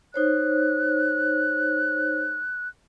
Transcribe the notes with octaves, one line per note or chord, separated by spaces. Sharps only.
D#4 C5 C#5 F#6